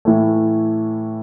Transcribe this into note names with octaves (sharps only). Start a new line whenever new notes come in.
A2 E3 A3